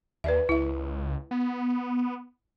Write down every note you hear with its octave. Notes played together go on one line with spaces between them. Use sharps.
D#2 B4 D5 E5
C#2 E4 E5
B3